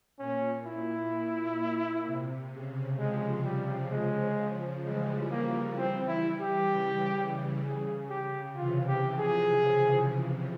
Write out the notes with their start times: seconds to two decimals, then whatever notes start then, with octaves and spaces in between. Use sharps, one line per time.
0.19 A#2 C#4
0.66 E4
2.05 C3
2.52 C#3
2.98 C#3 F3 G#3
3.44 G3
3.91 G#3
4.84 E3 G3 G#3
5.31 A#3
5.77 C4
6.08 E4
6.40 G4
6.70 C#3
7.64 G#4
8.10 G4
8.56 C3 E3 F4
8.88 G4
9.02 C#3 F3
9.18 G#4